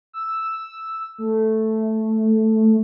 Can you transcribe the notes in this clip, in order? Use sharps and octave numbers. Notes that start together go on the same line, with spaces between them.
E6
A3